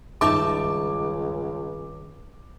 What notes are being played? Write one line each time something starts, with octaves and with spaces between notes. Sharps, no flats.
C#2 G2 D#3 D#4 E5 A5 D6